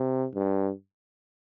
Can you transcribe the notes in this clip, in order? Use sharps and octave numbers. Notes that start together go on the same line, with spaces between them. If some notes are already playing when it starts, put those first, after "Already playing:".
Already playing: C3
G2